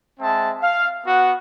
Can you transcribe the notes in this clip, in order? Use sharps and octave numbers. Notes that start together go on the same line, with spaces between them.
G#3 C4 E5 A5
F5
B3 F#4 F#5